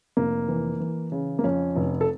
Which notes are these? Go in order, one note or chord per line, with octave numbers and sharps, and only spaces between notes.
F1 A#3
E3
E3
C#3
A#3
F2 C#4
F1
A4